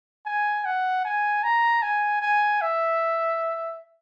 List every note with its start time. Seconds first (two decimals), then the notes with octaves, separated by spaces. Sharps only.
0.26 G#5
0.65 F#5
1.05 G#5
1.43 A#5
1.82 G#5
2.22 G#5
2.61 E5